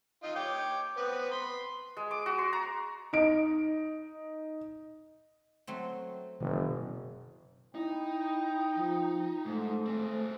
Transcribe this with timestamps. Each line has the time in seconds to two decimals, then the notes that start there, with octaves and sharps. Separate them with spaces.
0.23 D#4 F4 D#5
0.36 C#5 G5 D6
0.97 B3 C4 B4
1.31 B5 C6
1.97 G#3
2.11 D6
2.26 F#4
2.38 C6
2.53 A#5
3.13 D#4 D7
5.67 F#3 A3 C4
6.40 F#1 B2 D#3 E3
7.75 D#4 E4 G5
8.76 F3
9.45 G#2 A3 C5
9.86 C4 G#4